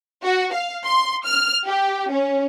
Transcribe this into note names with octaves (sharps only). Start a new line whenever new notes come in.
F#4
F5
C6
F6
G4
C#4